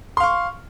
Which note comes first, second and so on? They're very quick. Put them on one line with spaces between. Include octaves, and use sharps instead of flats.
C6 F5 C#6